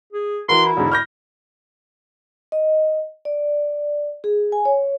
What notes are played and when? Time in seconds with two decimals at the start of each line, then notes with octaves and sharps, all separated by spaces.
0.12 G#4
0.49 E3 F#4 A#4 C6
0.65 E4
0.77 E1 G#2 D3
0.92 F6 G6 A#6
2.52 D#5
3.25 D5
4.24 G#4
4.52 G#5
4.65 C#5